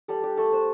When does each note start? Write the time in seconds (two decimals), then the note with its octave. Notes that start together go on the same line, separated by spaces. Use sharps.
0.08 G3 A4
0.23 D4 G4
0.37 A3 A4
0.53 D4 C5